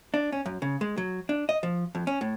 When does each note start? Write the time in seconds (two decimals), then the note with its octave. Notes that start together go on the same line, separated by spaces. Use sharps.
0.14 D4
0.32 C#4
0.46 F#2
0.62 C#3
0.81 G#3
0.97 F#3
1.29 D4
1.49 D#5
1.63 F3
1.95 F2
2.07 C#4
2.21 A2